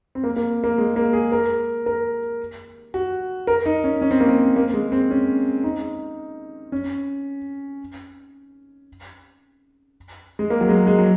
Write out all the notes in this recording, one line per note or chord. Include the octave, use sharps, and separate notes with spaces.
C4
A#3
A#3
A#3
G#3
A#3
G#4
A#4
A#4
F#4
A#4
D#4
C#4
C#4
C4
A#3
C4
A#3
G#3
C4
C#4
D#4
C#4
G#3
A#3
F#3
G#3
G#3
F#3